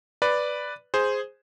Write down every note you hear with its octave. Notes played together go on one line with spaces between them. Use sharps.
B4 D5
G#4 C5